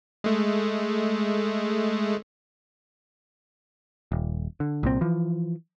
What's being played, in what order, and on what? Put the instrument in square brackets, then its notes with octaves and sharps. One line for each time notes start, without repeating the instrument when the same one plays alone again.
[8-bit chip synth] G#3 A3
[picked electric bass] D#1
D3
C2 A#2 C4
E3 F3